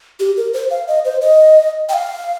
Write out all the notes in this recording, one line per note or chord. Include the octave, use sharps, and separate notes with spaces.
G4
A#4
C5
F5
D#5
C5
D#5
G5
F5